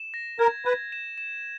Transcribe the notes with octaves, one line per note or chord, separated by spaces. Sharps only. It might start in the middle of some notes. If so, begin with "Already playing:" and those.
Already playing: E7
A#6
A#4 G#6
B4 G#6
E7
E7